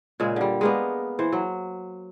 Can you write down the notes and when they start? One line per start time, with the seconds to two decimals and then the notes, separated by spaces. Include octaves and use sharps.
0.20 A#2 C#3 G#3
0.36 D3 G3
0.61 G#3 A#3 B3
1.19 E3 C5
1.32 F#3